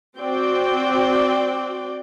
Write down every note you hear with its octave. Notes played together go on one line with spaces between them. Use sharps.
C4 F#4 D5 G5